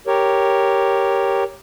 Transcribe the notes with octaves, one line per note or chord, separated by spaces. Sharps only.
G4 A#4 C#5